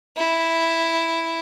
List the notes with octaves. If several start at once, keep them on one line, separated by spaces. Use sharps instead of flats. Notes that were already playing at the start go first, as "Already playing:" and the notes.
E4